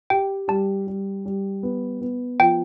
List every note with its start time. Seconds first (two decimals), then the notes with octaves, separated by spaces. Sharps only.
0.10 G4 G5
0.48 G3 A5
0.87 G3
1.26 G3
1.63 B3
2.01 B3
2.40 F3 G5